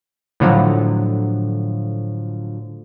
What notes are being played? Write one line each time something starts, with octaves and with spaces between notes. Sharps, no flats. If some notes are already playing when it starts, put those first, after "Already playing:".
A2 D3 F3 F#3